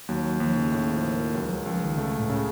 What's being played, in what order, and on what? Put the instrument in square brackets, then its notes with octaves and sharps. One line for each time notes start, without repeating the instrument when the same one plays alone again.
[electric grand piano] D#2 [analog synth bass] F#3
[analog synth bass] F#3
[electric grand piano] D#2 [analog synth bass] F3
[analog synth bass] C#3
[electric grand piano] A2 [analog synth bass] C#3
[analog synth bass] F3
[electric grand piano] A#4
[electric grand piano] C#2 [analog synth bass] F#3
[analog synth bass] F3
F#3
[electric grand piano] C#2 [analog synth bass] F3
[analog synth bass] D#3
[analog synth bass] C#3 [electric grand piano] A3
[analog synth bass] A2
[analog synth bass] A2 [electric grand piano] C#3